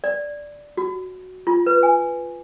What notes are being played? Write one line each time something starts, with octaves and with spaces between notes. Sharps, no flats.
D5
F#4
F4
B4
G#5